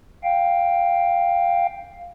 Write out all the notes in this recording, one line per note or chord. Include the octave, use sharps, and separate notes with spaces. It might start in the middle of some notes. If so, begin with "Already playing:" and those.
F5 G5